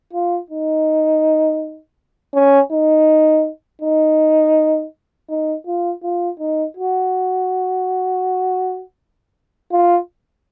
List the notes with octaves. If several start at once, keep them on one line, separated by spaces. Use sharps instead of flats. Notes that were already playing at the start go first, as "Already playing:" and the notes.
F4
D#4
C#4
D#4
D#4
D#4
F4
F4
D#4
F#4
F4